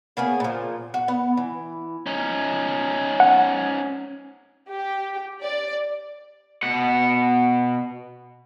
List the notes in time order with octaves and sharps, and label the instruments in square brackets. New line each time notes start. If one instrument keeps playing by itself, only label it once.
[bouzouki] C#3 A#3 B3 G#4
A#2 F3
F#4
B3 F#5
E3
[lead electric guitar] C#4 D#4
[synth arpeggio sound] F#5
[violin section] G4
D5
[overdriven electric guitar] B2 F#5